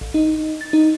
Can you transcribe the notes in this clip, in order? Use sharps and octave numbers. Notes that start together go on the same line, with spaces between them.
A1
D#4
A6
D#4